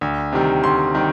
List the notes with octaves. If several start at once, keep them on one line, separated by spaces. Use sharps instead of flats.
D2
C3 D#3 G3
D2 C6
C3 D#3 G3